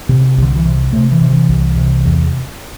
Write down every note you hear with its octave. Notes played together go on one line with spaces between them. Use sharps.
C3
C2 D3
E3
C3
C3 A3
E3
C3
E3
C2
C3
E2